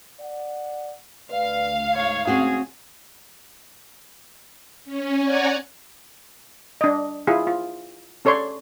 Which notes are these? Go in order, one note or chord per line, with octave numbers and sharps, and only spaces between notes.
D5 F#5
D2 B4 D5 F5
G#2 C#5
C4 C#4 F#4 G#4
C#4
C#5 D5 F#5 G#5 A#5 G#6
D4 D#5
E4 F4 G#4
F4
C#4 A4 C#5 D5 C6